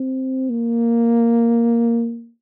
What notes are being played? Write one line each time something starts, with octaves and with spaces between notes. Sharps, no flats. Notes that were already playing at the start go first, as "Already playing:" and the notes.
Already playing: C4
A#3